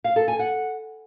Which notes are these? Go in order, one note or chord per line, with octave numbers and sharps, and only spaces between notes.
F5
A4
G#5
F#5